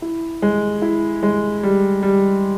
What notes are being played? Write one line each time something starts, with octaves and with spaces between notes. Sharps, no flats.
E4
G#3
E4
G#3
G3
G3